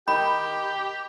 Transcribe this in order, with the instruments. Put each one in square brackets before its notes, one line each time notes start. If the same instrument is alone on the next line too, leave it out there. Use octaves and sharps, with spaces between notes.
[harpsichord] D#3 [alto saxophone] G4 [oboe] G5 [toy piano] B5